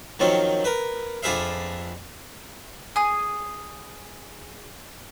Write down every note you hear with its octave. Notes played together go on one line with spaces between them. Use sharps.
D#3 F3 F#3 C4 C#4
A#4 B4
F2 D4 G#4 B4 E5 F5
G#4 D#6